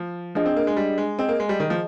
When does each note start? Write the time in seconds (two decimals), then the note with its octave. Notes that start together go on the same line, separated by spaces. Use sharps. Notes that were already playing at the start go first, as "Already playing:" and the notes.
Already playing: F3
0.35 F3 D4 G#4 D#5 G#5
0.46 C4
0.56 A#3
0.67 G#3
0.77 G3
0.98 G#3
1.19 C4 G#4 D#5 G#5
1.29 A#3
1.40 G#3
1.49 G3
1.60 D#3
1.70 F3